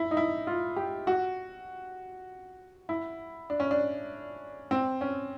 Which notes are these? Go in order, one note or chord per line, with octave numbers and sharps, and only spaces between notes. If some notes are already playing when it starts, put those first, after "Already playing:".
Already playing: E4
D#4
E4
F4
G4
F#4
E4
D4
C#4
D4
C4
C#4